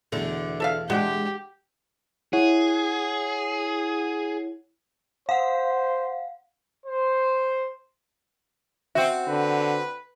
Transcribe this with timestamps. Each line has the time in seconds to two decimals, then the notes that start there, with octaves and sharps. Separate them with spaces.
0.12 E2 B2 D3 A3
0.60 A4 E5 F5
0.90 G#3 D4 F#4 G4
2.33 E4 G#4 C#5 F#5
5.29 C5 F5 F#5
6.86 C5
8.95 C4 F#4 E5
9.28 D3 B4